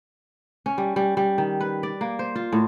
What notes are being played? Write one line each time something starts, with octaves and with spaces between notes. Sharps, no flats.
C#4
G3
G3
G3
D#3
B4
D5
A#3
C5
F4
A2